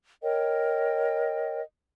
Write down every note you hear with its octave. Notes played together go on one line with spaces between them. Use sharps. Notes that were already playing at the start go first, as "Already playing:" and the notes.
A#4 C#5 D#5 G5